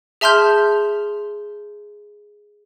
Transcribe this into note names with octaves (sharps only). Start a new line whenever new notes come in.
G#4 E5 A5 C6 F6 G6